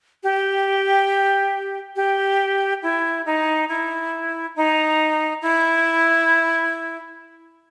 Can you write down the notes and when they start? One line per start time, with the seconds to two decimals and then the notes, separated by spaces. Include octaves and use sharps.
0.24 G4
1.96 G4
2.83 E4
3.26 D#4
3.69 E4
4.56 D#4
5.42 E4